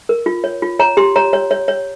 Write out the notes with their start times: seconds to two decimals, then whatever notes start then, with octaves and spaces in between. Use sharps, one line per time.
0.09 A#4
0.26 F4
0.44 C#5
0.62 F4
0.79 C#5 A#5
0.97 G4 C6
1.16 C#5 A#5
1.33 C#5
1.51 C#5
1.68 C#5